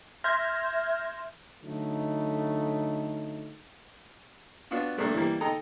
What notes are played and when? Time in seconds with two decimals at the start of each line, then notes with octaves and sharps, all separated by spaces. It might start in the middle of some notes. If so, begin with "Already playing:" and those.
0.24 E5 C6 F6 G6 G#6 A#6
1.63 D3 F#3 A3 D#4
4.71 B3 D4 F4 F#4
4.98 G2 A3 A#3 D4
5.14 E3 G3 A#3
5.41 D#4 A4 G5 A#5